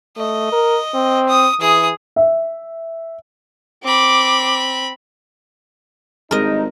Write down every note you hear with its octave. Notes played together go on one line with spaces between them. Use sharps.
A3 D#5
A#4
C4
D#6
E3 G#4 D#6
E5
C4 B5 D6
G#1 G2 G#3 D#4 A#4 D#5